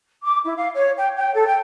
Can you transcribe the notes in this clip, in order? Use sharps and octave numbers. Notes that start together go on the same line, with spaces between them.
D6
E4
F5
C#5
G5
G5
A4
G5